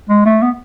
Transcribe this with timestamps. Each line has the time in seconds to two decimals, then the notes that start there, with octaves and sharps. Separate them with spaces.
0.09 G#3
0.26 A3
0.42 B3